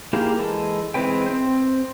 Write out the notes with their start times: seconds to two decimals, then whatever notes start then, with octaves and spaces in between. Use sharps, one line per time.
0.13 A#3 E4 G4 G#4 F5
0.39 E3 G#3 A4
0.94 E3 G#3 C4 B4 G5
1.26 C4 C5